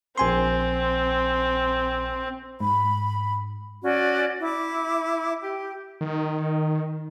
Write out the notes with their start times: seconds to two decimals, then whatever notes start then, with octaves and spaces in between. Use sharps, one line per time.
0.18 A#1 C4 G#5 C6
2.60 G#2 B5
3.83 C#4 F#4 D5
4.41 E4 D6
5.41 G4
6.01 D#3